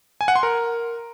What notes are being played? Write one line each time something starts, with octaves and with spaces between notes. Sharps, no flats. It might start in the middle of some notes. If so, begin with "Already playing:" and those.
G#5
F#5
C6
A#4